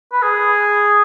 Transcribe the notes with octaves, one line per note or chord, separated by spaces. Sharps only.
B4
G#4